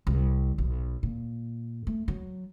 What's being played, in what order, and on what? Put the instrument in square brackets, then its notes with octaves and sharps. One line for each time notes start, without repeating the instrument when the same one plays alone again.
[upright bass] C2
B1
A#2
A3
F#3